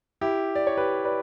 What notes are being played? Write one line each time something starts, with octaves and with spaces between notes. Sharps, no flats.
E4 G4
D5
C#5
G4 B4
B4 D5